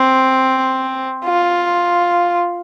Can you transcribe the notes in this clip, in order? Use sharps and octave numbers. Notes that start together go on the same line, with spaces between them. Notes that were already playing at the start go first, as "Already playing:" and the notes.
Already playing: C4
F4